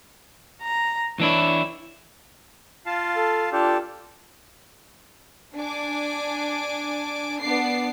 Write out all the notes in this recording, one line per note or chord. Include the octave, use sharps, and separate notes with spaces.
A#5
E3 D4 E4 C#5
F4 F5 A5
A4
D4 F4 G4 A4
D4 G#5 D6
B3 D4 D6 C7